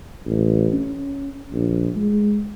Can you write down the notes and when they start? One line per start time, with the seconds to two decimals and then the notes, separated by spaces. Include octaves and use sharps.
0.26 A1
0.74 C#4
1.53 A#1
1.96 G#3